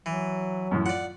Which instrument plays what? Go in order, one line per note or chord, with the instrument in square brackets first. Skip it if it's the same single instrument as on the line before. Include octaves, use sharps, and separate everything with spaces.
[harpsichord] E3 [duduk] F#3
[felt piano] F#2 A2 E3
[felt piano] F4 [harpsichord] D5 F#5